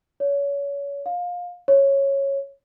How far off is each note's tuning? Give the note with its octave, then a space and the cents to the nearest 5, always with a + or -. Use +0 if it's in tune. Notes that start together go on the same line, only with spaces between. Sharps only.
C#5 +30
F5 +25
C#5 -10